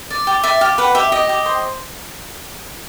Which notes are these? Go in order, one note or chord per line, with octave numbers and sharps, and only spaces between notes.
D5
G4
D5 E5
G4 F5
B4 F#5
G4 E5
G4 D#5
G4
C5